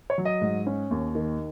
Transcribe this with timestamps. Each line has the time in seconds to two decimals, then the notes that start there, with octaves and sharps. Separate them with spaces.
0.10 C#5
0.18 F#3
0.25 D#5
0.41 G#2
0.66 C#4
0.91 D#2
1.15 D#3